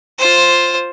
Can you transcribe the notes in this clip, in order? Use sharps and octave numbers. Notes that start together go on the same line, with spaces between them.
F4 C5